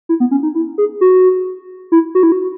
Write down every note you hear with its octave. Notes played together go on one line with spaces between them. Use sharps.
E4
B3
C#4
D#4
E4
G#4
F#4
E4
F#4
E4
F#4